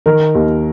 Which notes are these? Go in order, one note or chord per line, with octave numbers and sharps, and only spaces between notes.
D#3 A#4
D#2